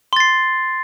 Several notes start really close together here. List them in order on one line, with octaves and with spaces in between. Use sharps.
C6 A6 C7